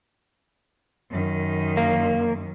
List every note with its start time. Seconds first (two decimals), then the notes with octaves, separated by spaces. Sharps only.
1.11 F#2 D#3
1.77 A#3